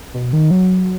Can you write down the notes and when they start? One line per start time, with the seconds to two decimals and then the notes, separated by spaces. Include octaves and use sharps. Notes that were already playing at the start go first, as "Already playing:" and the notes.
0.14 B2
0.33 D#3
0.51 F#3